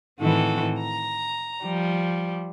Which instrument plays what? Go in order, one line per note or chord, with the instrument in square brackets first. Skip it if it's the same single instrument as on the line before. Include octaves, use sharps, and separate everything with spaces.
[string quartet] A2 D#3 E3 C4 F#4 A4
A#5
F3 G3